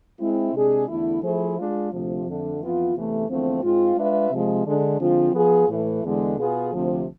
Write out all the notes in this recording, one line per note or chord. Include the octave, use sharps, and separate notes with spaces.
G#3 C4 E4
C3 G#3 D4 G#4
E2 D3 A3 E4
F3 A3 E4 G#4 C5
G#3 D4 F4 G#4
D2 C3 F3
F2 D3 A3
F2 E3 B3 F4
E2 C3 E3 A3
E2 D3 F3 A3 C4
G#2 G#3 C4 F4
G#3 D4 F4 B4 E5
C3 F3 G#3
D3 G#3 D4
D3 F3 G#3 C4 F4
F3 B3 F4 G#4
A2 E3 A3
E2 D3 G#3
B2 B3 F4 G#4
D2 C3 F3